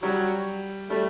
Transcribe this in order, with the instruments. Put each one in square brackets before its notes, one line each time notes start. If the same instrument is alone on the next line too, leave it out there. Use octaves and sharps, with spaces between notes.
[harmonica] F#3 [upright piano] G3
[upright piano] G3 [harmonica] A3